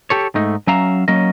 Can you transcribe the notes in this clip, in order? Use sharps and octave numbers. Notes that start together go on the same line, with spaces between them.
G4 A4 C#5
G#2 A3 D#4
F#3 C#4 E5 F5 A#5
F#3 A#3 C#4 D#5